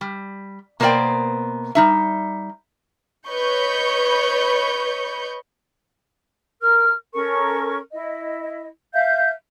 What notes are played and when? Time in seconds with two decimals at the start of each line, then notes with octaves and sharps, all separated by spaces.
0.01 G3
0.80 B2 A#3 B3 C5 D5 G5
1.75 G3 D#4 E5
3.26 B4 C#5 D#5 B5 C#6 G6
6.61 A#4 F6
7.13 C#4 A4 A#4 C#6
7.92 E4 D#5
8.92 E5 F5 G6